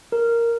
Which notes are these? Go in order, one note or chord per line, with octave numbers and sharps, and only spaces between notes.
A#4